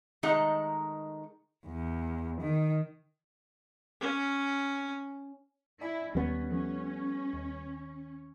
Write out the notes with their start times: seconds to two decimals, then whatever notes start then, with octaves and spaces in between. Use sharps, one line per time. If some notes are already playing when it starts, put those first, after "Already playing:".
0.23 D#3 G#3 A3 D#4 F#5 A#5
1.67 E2
2.41 D#3
4.01 C#4
5.81 E4 D5 G#5
6.15 D#2 G3 B3 C#4
6.51 F3 A3 C#4
7.33 D#2